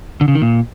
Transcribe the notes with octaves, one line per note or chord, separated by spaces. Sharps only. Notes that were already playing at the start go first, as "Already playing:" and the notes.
D3
C#3
D#3
A#2